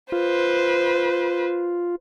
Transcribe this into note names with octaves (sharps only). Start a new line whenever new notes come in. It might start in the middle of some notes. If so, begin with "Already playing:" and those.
F4 B4 C5